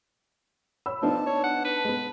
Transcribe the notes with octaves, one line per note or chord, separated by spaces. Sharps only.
C#5 B5 E6
F3 B3 D4 D#4 A5
C#5
F#5
B4
G#3 B3